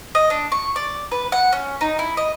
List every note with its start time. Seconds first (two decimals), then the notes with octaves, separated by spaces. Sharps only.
0.15 D#5
0.30 D4
0.52 C#6
0.76 D5
1.12 B4
1.32 F#5
1.53 C#4
1.81 D#4
1.99 E4
2.17 D#5